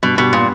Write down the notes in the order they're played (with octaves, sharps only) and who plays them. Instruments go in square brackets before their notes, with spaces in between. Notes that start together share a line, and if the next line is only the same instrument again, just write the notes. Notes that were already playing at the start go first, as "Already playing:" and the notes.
[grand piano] G2 [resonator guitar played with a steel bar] B2
[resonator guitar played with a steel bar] B2 [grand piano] G4
[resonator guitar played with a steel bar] A#2 [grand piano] B3